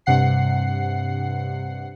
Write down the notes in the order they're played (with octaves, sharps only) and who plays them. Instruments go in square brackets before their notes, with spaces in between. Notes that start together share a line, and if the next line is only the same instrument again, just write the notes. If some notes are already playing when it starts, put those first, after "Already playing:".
[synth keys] G2 C3 F#5 C7